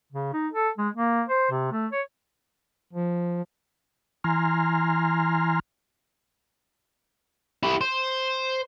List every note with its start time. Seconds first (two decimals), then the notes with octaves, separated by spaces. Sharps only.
0.12 C#3
0.33 D#4
0.53 A4
0.78 G#3
0.95 A#3
1.28 C5
1.51 C3
1.72 A3
1.92 C#5
2.93 F3
4.24 E3 G#5 A#5 C6 F6
7.63 E4 G4
7.81 C5